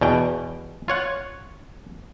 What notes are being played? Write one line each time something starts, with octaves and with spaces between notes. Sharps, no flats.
E2 B2 G5
F4 C#5 F#5